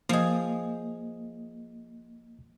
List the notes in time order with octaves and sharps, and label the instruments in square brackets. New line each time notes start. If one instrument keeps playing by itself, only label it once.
[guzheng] F3 G#4 [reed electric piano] A#3 D#5